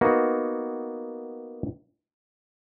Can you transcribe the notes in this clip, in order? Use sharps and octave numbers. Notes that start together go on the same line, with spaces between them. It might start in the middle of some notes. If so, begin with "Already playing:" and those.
A#3 B3 D#4 F#4